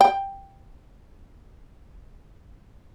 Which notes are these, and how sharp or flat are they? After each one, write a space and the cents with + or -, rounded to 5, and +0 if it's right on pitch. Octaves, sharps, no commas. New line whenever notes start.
G5 +5